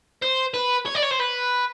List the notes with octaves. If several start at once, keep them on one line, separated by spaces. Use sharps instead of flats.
C5
B4
C#5
D5
C#5
C5
B4